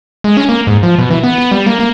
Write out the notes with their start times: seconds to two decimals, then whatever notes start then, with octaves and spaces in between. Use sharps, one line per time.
0.24 G#3
0.37 C#4
0.49 A#3
0.67 G#2
0.83 F3
0.98 B2
1.11 E3
1.23 B3
1.38 B3
1.51 G3
1.66 A#3
1.80 A#3